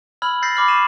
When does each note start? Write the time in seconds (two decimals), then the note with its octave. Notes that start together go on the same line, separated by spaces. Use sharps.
0.22 B5 E6 F6 G#6 F#7
0.42 E6 G6 A6 A#6 C7
0.56 B5 D6 F6 F#7
0.68 C#6 A#6 D#7 E7